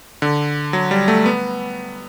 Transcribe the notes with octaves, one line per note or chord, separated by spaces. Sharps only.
D3
F#3
G3
A3
B3